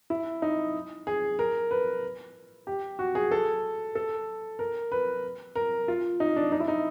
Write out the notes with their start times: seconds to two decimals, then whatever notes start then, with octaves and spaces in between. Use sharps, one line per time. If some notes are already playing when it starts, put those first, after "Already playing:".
0.10 E4
0.42 D#4
1.07 G#4
1.39 A#4
1.71 B4
2.67 G4
2.99 F#4
3.15 G#4
3.31 A4
3.95 A4
4.59 A#4
4.92 B4
5.55 A#4
5.88 F4
6.20 D#4
6.36 D4
6.52 D#4
6.60 E4
6.68 D#4